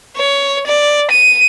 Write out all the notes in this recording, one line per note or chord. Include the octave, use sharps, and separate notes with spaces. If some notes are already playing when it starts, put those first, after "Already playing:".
C#5
D5
D#7